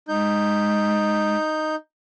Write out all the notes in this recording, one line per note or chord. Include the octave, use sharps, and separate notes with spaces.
G#3 D#4 G6